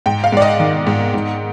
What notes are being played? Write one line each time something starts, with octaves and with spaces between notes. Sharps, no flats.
G#2 G5
F5
G#2 D5
D#5
D#3
G#2
G#2